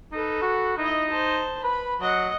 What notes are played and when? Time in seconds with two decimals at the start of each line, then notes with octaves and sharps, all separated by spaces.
0.12 D#4 A4 B4
0.42 F#4
0.78 D#4 E4 D#5
1.10 C5 A5
1.64 B4 B5
2.01 F#3 D#5 F#5